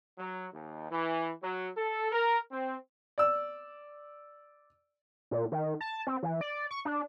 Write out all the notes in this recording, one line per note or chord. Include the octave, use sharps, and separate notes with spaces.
F#3
D#2
E3
F#3
A4
A#4
C4
D5 E6
A#2
D#3
A5
C4
E3
D5
C#6
D4